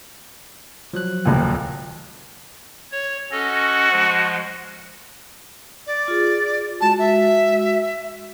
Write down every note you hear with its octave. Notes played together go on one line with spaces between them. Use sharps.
F3 F#3 F#6
D#1 C#2 A#2
C#5
C#4 F#4 A4 D#5
F3 G#3
D5
F4 G#4
G#3 F#4 A5
E5